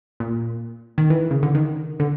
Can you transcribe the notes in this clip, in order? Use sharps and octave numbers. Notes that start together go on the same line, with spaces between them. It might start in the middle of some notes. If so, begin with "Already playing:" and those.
A#2
D#3
E3
C#3
D3
D#3
D3